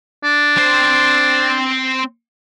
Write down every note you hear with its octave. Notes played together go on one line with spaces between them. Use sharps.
D4
C4 C5